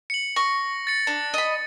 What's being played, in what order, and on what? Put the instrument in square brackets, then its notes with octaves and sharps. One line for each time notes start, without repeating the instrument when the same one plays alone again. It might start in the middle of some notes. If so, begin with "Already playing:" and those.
[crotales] C#7 F#7
[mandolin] C#6 [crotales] A#6
[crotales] A6 C#7
[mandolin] D4
D#5 B5